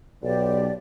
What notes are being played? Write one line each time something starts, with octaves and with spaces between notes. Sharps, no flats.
B1 G4 D5